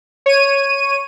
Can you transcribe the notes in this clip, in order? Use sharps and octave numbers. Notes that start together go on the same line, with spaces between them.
C#5 D#7